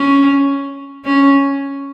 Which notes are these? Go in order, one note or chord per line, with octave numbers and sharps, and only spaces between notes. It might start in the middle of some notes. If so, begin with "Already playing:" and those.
Already playing: C#4
C#4